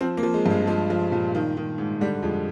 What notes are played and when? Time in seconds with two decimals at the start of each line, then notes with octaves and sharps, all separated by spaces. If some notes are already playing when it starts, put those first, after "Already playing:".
0.01 F3 C4
0.17 A#3
0.23 F3
0.34 G#3
0.46 G2 G#3
0.67 F3 G#3
0.90 F3
1.12 A#2
1.35 D#3
1.57 D#3
1.78 G#2
2.01 D3 G3
2.23 F2 G#3